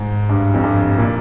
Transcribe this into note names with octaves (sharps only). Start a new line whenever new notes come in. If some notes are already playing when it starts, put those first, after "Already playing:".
Already playing: G#2
G2
F2
G2
A#2